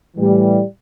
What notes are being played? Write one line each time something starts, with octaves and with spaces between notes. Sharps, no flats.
A2 E3 G3